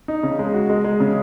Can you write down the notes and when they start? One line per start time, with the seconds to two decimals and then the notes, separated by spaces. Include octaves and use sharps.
0.08 D#4
0.23 C#3
0.39 G#3
0.54 F#4
0.69 G#3
0.84 G#3
1.00 C#3